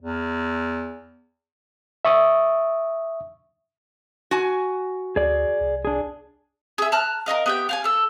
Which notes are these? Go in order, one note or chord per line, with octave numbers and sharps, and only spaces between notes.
E2
E5 C#6 D#6
F#4 G#5
D2 G#4 D5
C2
D4 G#4
G#4 E5
A5 A#5 F6 F#6
A#4 C#5 D#5 F5
B3 G4 G5
F5 G5 G#5
A4 E6